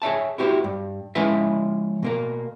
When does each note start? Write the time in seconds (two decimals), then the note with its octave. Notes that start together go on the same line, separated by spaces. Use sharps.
0.02 G#4 C#5 E5 A5
0.38 E4 F#4 G4 B4 C5
0.64 G2
1.15 F3 G#3 C#4 E4 B4 E5
2.03 B2 A#3 A#4